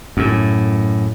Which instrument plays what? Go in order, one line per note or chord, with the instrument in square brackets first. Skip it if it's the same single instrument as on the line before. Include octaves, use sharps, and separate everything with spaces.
[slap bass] F#2 A2